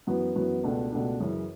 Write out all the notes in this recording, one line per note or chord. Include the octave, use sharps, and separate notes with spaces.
F#2 E3 B3 F#4 B4
F#2 E3 B3 F#4 B4
C#2 B2 A3 D4
C#2 B2 A3 D4
F#2 C#3 E3